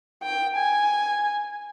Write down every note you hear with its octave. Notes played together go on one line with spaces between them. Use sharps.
G5
G#5